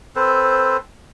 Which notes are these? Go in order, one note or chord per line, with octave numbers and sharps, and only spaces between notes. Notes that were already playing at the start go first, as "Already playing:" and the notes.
C4 A4 B4 C5